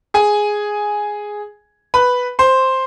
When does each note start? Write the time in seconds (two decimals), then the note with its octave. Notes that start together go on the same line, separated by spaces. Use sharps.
0.14 G#4 G#5
1.94 B4 B5
2.39 C5 C6